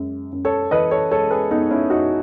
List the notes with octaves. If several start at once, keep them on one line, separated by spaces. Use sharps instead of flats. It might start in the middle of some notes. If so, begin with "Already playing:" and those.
Already playing: F#2 G#3
F#2
A4 C#5
E3 B4 D#5
A4 C#5
G#3 A4 C#5
G#4 B4
F#2 B3 D#4
C#4 E4
F#2 D#4 F#4